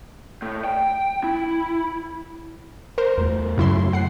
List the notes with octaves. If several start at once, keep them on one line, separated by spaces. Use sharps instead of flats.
A2
G5
E4
A#4 C5
E2 A3
F#2 C#3 F#3 A3 E4 C6
F#5 C7